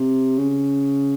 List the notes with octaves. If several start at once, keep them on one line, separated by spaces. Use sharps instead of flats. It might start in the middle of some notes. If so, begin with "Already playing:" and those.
Already playing: C3
C#3